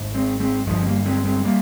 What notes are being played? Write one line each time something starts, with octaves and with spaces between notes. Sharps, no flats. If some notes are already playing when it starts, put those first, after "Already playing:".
Already playing: G#1 G#2
G#3 C4
G#3 C4
G1 G2 F3 G#3
C4
G3 A#3
G#3 C4
G#3 C4
G3 A#3